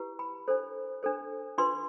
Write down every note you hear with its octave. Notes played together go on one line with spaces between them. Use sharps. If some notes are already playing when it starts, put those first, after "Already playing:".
Already playing: E4 G4 B4
B5
D4 A4 C5
D4 A4 C5
D4 F4 B4 C6